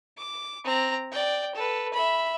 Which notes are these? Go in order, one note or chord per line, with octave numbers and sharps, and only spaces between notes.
D6
C4 A#5
D5 G5
A4 B4
E5 B5